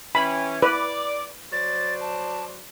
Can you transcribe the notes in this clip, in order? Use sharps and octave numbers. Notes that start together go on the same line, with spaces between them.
E3 C#4 G5 B5
B4 D5 D6
F#3 C5 D5 A6
A5